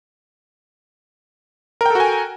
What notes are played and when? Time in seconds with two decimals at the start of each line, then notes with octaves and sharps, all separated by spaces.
1.81 A#4
1.86 G5
1.90 A4
1.95 F#4
2.00 G#5